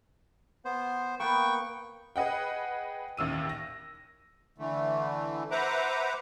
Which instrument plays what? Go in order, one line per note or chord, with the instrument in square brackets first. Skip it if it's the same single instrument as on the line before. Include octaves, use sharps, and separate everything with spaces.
[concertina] B3 C5
[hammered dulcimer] A#3 B3 [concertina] G5 C#6
[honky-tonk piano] G#4 B4 D#5 F#5 G5
A1 D#2 E6 D#7
A#6
[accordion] D3 E3 A3
B4 C5 E5 F#5 A#5 D6